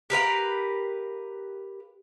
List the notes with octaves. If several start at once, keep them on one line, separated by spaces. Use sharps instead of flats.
G4 A#4 B4 F5